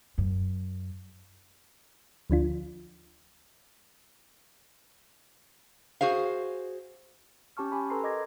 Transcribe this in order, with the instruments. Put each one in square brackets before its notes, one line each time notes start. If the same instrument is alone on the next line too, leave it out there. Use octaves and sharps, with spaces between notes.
[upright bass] F#2
[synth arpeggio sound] D2 F3 D4 F4
[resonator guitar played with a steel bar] F#4 G#4 C5 F5
[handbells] C#4 G4 A5 C#6 F6
G4 G#5 B5
A4 B4 A#5 C6 C7
A#4 D#5 D6 G#6 A#6